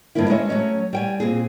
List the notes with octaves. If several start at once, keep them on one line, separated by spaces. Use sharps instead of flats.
G2 D3 D#3 F3 A#3 E4
G#3 C#4 C#5 D#5 E5
F#3 A3 C#4 C#5
G3 G5 G#5
A#2 C4 G#4